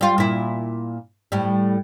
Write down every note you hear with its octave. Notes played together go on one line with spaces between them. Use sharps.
G3 F4
A#2 E4
A2 G3